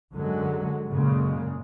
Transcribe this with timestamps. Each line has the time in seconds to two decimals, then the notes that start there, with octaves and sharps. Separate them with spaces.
0.12 F#2 D3 F#3 G#3
0.87 F#2 A#2 C#3 G#3